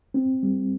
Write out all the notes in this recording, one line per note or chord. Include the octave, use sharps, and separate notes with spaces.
C4
G3